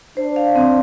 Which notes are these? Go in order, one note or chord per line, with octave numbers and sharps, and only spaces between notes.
D4 C5
F5
C4